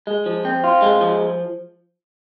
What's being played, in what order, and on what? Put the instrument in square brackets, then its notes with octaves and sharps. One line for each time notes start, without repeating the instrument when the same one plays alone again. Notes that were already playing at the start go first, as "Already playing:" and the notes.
[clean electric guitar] G#3
F3
C4
F4
G#3
F3